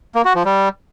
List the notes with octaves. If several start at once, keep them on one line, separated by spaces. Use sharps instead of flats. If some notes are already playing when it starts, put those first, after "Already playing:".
A#3
F#4
F3
G3